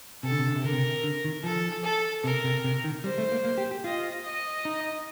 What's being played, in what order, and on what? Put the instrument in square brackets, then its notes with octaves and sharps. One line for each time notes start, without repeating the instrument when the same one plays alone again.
[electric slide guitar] C3 [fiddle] A4
[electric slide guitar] D3
C3
D3
C3
[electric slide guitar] D3 [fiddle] A#4
[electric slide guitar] C3
D3
D#3
[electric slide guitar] F3 [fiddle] A4
[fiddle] A4
[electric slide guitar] C3 [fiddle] A#4
[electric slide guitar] C3
C3
D#3
[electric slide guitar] G3 [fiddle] C5
[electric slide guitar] A3
A#3
A#3
G4
G4
[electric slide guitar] F4 [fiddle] D#5
[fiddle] D#5
[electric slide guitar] D#4